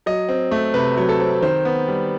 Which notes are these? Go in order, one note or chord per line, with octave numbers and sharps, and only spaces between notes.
F#3 D#5
C4
A3
C3 B4
F#3
A4
C4
D#3 C5
B3
G3